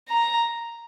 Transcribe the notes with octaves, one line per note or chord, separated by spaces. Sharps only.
A#5